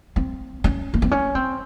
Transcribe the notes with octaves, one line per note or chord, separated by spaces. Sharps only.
C4
C#4
A#3
C4
C#4
C4